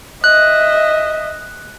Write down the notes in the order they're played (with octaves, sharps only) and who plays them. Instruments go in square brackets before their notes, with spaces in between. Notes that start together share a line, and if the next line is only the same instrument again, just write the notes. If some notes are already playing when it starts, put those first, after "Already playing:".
[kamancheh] D#5 E5 [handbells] F#6